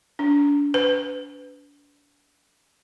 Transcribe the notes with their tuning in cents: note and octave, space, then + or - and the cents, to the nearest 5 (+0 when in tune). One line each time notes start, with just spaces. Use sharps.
D4 -35
B4 +25